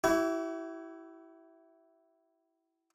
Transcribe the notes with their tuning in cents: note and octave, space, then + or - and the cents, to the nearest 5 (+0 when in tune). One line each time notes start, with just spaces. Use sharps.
E4 +0 G4 -45 C#6 +40